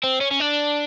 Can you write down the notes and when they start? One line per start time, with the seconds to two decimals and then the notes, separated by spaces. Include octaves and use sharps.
0.04 C4
0.21 C#4
0.31 C#4
0.40 D4